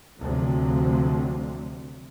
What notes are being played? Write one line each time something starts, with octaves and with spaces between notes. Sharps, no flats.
D2 C3 F3 F#3